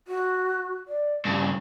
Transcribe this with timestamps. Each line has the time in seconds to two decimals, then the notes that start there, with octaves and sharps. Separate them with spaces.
0.08 F#4
0.88 D5
1.25 G2 C#3 G4